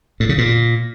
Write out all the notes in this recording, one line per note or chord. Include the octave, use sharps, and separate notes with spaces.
A2
C#3
A#2